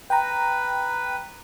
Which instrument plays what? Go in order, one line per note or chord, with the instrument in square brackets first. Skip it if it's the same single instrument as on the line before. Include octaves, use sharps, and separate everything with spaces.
[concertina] B4 [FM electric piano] G5 A#5